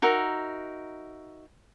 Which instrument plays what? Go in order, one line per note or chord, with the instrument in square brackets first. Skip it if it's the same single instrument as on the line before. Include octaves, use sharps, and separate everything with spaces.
[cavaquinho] D#4 F#4 A#4 E5